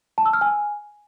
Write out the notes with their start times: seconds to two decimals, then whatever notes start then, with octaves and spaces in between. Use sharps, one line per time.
0.18 A5
0.26 E6
0.33 F6
0.41 G#5